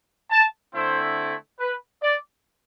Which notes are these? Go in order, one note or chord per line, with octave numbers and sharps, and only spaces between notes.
A5
D3 A3 C4 E4 C5
B4
D5